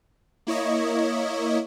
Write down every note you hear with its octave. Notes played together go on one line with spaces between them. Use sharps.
A#3 E4 C#5 D#5